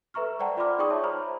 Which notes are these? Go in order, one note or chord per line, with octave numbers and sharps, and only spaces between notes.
A4 B4 E5 A#5 C#6 F6
C5 D5 F#5 G5 A5 A#5
F4 D5 B5 C6 D6 F6
D#4 G#4 D5 G5 C#6 D#6
C#5 E5 A5
C5 A#5 B5 F6